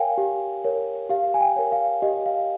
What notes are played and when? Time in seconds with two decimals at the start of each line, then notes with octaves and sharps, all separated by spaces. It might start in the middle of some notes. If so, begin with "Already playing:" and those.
Already playing: A#4 C#5 F5 G5 G#5
0.18 G4
0.64 A#4 C#5
1.09 G4 F5
1.34 G#5
1.41 G5
1.56 A#4 C#5
1.72 F5
2.02 G4 D#5
2.26 F5